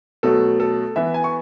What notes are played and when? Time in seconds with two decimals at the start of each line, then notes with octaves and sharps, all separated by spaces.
0.23 B2 F#3 A3 A4
0.60 A4
0.96 E3 B3 E5
1.14 G#5
1.24 C#6